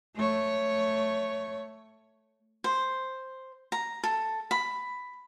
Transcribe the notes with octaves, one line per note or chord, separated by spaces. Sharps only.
A3 C#5
C5
A#5
A4
B5